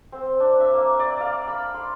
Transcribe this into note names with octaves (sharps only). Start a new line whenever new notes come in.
C4
D4
E5
A#3
D5
F5
B5
C6